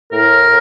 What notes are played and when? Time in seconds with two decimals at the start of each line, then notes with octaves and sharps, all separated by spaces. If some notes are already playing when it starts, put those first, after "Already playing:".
0.12 A2 A#4